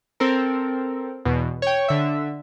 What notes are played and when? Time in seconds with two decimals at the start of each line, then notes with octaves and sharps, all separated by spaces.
0.20 C4 A4 A#4
1.25 E2 B2
1.62 C#5 G5
1.88 D3 E5